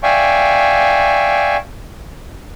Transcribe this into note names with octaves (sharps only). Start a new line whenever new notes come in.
D5 E5 F5 G5 G#5 C#6